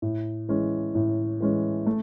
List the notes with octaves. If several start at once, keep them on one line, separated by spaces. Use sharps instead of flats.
A2
E3 G#3 C#4
A2
E3 G#3 C#4
A3